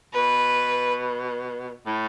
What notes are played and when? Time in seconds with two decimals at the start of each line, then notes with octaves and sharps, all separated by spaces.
0.14 B2 B4
1.87 A2